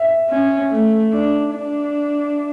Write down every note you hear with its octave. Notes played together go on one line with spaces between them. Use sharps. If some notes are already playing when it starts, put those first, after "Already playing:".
Already playing: E5
C#4
A3
D4
D4